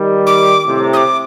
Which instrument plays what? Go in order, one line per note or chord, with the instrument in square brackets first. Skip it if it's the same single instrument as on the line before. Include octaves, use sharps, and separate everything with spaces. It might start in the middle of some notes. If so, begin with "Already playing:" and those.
Already playing: [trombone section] D#3 G3
[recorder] D6
[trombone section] A2 C3
[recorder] D#6
D6